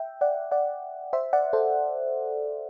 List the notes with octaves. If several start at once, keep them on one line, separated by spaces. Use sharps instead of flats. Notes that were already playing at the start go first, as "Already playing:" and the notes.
Already playing: E5 G5
D5 F#5
D5 F#5
C5 E5
D5 F#5
A4 C5